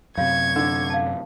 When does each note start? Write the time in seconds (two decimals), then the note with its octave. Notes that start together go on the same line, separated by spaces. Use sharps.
0.17 F#2 C3 F4 C#5 F5 C#6 G#6
0.56 D3
0.90 F5 A5